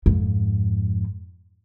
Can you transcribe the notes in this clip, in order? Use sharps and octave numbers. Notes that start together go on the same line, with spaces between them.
F2 G#2